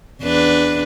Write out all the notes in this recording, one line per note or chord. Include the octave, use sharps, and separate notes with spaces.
E2 D4 B4